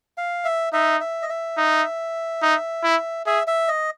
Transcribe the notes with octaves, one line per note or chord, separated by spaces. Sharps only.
F5
E5
D#4 E5
E5
D#5
E5
D#4
D#4
E4
G#4 E5
E5
D#5